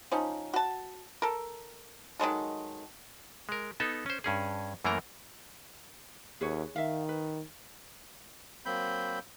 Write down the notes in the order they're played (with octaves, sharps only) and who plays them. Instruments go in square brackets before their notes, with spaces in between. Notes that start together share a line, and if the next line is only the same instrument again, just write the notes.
[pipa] F3 C#4 D#4
F#4 A5
A4 A#4
D#3 F#3 G#3 A4
[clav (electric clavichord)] G#3 A#4
B3 D#4 A4
C#4 C5
G2 C#4 G#4
F#2 E3 A3 A#3 A#4 A#5
[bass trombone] D#2 [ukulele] G#4 B4 C#5
[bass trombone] D#3 [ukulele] E5 F5
[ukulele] B4
[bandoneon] F#3 A#3 C4 B5 G6